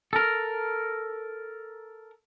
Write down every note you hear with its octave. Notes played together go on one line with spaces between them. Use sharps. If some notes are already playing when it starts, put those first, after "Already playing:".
A4 A#4